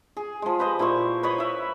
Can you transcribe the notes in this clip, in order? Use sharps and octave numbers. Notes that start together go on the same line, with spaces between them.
G#4
F3 G#3
G4 B4 C5 D#5
A#2 E4 C5 C#6
B4 C#5 D#5 B5
E4 E5